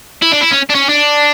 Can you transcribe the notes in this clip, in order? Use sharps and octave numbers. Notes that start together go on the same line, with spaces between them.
E4
D4
E4
C#4
D4
C#4
D4